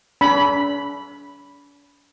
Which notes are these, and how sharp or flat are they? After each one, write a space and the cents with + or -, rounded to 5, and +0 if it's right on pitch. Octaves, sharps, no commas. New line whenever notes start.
D4 -45 B5 +0